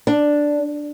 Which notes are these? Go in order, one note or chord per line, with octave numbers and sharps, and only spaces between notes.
D4